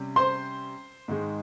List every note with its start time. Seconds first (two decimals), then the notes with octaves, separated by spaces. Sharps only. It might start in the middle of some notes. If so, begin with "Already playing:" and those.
Already playing: C3 G3 C#4
0.16 C5 C6
1.08 G#2 D#3 G#3